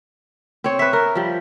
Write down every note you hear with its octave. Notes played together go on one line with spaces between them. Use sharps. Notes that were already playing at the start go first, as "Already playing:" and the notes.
C4 C#5
B4 E5
A#4
F3 G3